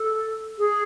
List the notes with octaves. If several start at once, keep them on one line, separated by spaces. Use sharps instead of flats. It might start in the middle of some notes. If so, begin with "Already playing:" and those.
Already playing: A4
G#4